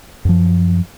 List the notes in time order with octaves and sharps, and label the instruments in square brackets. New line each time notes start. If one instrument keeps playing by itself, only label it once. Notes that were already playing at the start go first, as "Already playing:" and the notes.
[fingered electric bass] F#2 F3